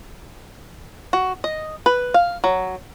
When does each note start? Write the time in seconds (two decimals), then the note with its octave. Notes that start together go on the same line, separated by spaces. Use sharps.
1.13 F#4
1.44 D#5
1.86 B4
2.14 F5
2.44 F#3